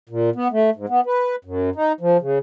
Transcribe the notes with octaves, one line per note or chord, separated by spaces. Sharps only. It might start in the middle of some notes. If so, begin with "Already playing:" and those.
A#2
B3
A3
G#2
B3
B4
F#2
D#4
F3
C#3